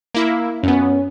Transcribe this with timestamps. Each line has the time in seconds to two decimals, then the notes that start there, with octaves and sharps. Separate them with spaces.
0.14 A#3 E4 E5
0.63 F#2 B3 C#4